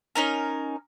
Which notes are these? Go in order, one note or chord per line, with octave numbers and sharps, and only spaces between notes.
C#4 D#4 A#4